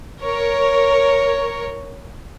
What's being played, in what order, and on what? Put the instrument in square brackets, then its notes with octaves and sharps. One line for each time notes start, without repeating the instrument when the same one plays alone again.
[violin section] A#4 C#5